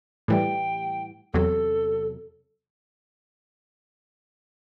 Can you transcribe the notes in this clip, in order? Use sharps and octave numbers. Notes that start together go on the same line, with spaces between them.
A2 E3 G3 G5
E2 C3 F#3 A4